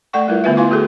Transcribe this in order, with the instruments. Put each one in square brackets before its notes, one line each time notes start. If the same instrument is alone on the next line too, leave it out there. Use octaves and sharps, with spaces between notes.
[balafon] A3 A4 D5 F#5 C#6
G3 E4 F4 A#4 B4
D3 A3 B3 F4 B4 E5
E4 F4 B4 F5 G#5 C6
A3 F#4 G#4 A4